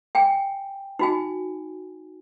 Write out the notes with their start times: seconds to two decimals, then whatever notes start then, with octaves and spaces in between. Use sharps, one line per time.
0.15 G5 G#5
0.99 D#4 F#4 G#5